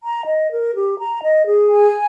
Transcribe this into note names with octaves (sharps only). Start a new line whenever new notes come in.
A#5
D#5
A#4
G4
A#5
D#5
G#4
G#5